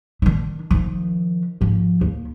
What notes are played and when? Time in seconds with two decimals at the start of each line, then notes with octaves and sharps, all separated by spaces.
0.22 D#3 D4
0.71 D#3 F3
1.61 G#2 F3
2.01 D#2